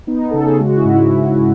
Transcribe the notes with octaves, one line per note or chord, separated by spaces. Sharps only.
B3 D#4
C#3 A4
G#4
G#3 F#4
E4
G#2
E4